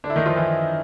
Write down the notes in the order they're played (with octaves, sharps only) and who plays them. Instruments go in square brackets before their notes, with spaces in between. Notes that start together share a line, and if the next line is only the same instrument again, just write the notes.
[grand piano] D3 D4
E4
D#3 D#4
F3 F4
E3 E4